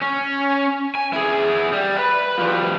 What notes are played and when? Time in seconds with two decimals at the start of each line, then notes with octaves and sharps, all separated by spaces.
0.02 C#4
0.95 G#5
1.13 E4 G#4
1.72 G3
1.97 B4 B5
2.38 F3 G3